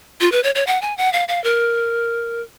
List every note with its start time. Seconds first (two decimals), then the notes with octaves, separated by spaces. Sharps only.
0.21 F4
0.32 B4
0.43 C#5
0.55 C#5
0.67 F#5
0.82 G#5
0.97 F#5
1.13 F5
1.28 F5
1.44 A#4